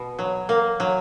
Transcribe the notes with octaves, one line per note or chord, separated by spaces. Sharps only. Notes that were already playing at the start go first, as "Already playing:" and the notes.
Already playing: B2
F#3
A#3
F#3